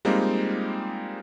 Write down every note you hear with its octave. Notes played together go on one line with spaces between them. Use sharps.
G3 G#3 A#3 C4 D#4 F4